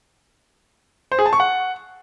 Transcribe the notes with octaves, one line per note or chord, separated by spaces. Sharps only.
C5
G#4
A5
C#6
F#5